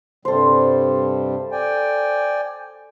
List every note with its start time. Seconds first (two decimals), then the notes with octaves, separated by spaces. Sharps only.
0.25 G2 C3 G3 A4 C5
1.52 D5 G5 G#5